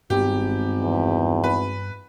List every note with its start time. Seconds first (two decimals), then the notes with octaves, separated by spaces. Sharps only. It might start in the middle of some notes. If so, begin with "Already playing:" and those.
0.10 G#1 G2 B3 G4
0.81 E2
1.44 B4